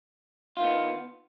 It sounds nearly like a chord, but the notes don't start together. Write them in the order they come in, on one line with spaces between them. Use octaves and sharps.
F4 D#3 B3